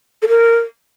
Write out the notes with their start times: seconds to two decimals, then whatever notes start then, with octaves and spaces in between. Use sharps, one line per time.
0.22 A4
0.28 A#4